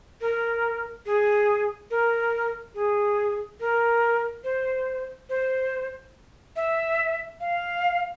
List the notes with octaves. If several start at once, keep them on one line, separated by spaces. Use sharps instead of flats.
A#4
G#4
A#4
G#4
A#4
C5
C5
E5
F5